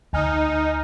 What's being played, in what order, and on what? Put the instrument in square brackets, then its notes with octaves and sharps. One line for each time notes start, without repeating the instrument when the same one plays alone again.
[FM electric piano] D2 G#5 F6 [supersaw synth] D#4